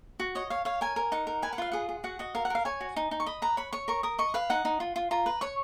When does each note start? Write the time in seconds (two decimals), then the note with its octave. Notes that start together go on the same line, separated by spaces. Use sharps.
0.20 F#4
0.35 C#5 D#5
0.50 C#5 F5
0.65 C#5 F5
0.81 A#4 G#5
0.96 A#4
1.12 D#4 F#5
1.27 A#4
1.42 B4 G#5
1.53 F#5
1.58 F4 F5
1.72 G#4 F#5
1.89 G#4
2.04 F#4 F#5
2.19 F#4 D#5
2.35 A#4 F5
2.45 F#5
2.50 A#4 F5
2.65 C#5 G#5
2.81 F#4
2.96 D#4
3.11 D#4
3.20 C#6
3.26 D#5 B5
3.42 B4 A#5
3.57 C#5 B5
3.73 C#5 C#6
3.88 A#4 C#6
4.03 A#4 D#6
4.19 D#5 C#6
4.34 B4 F5
4.50 D#4 F#5
4.65 D#4
4.80 F4
4.96 F4
5.11 F4 A#5
5.26 B4
5.41 C#5 C#6